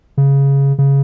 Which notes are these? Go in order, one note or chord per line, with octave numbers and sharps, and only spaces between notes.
C#3
C#3